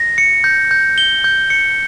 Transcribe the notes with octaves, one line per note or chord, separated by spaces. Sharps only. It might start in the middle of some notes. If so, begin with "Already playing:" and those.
Already playing: A#6
C#7
G6
G6
G7
G6
C#7